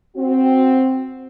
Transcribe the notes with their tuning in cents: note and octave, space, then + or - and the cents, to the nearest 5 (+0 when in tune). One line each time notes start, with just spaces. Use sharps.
C4 +0 F#4 +0